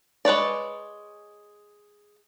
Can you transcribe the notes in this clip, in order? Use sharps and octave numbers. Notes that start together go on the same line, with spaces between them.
G#3 B4 C#5 D5